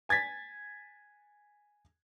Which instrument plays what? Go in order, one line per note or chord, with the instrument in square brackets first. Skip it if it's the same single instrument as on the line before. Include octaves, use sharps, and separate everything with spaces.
[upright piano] G#5 G#6 A6 B6